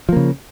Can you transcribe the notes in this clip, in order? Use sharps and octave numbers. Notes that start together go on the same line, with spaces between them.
C#3 F3 A#3